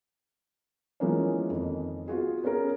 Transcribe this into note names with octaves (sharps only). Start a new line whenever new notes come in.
E3 F3 G#3 A#3 B3 C#4
F2 D#3
B3 F4 F#4 G#4
B3 C#4 G#4 A#4